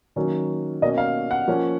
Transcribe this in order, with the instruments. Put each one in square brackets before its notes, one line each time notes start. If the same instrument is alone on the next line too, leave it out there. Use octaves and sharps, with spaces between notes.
[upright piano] D#3 F#3 A#3 C#4
B2 A#3 C#4 D#5
F5
F#5
F3 A#3 C#4